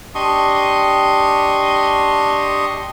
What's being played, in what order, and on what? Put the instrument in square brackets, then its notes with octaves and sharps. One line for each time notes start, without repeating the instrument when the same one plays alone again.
[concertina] D4 G4 D#5 C6 C#6 D#6